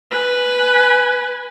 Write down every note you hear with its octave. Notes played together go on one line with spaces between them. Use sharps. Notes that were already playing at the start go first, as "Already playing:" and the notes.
B4 G#5